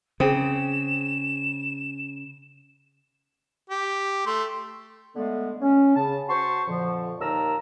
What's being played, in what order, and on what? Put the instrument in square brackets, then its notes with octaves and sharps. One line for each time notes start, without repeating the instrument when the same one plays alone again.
[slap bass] C#3 [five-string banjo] C4 [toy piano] G#4 G5 D#6 [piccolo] E7
[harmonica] G4
A3 C6
[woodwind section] D3 G#3 A3 B3 A4
C#4
C#3 A5
F#4 C5 A5 C6 C#6
F2 A#2 D3 F3
D#2 D#4 A#4 A5 A#5 E6